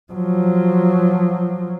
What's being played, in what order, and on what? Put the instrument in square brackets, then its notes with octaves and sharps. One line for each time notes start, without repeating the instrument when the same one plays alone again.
[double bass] F3 F#3